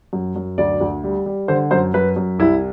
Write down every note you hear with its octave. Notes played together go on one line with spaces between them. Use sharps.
F#2
F#2
D2 D5
D2
G3
G3
D3 C5
F#2 C5
F#2 B4
F#2
C2 E4